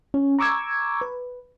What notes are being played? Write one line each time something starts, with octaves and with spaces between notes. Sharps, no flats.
C#4
A#5 C#6 D6 E6 G#6
B4